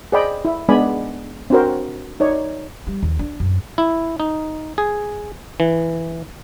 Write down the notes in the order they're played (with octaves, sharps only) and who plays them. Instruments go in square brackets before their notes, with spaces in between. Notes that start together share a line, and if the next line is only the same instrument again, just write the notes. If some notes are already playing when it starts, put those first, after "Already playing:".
[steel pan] G#4 C5 D5 D#5 G5 B5
E4
G#3 B3 D4 D5 G#5 B5
C4 D4 F#4 A#4 C5
D#4 C#5 D5
[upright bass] G3
D#2
D4
F#2
[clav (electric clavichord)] E4
D#4
G#4
E3